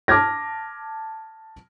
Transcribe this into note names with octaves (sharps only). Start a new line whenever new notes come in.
A5 D6 F6 G#6 A#6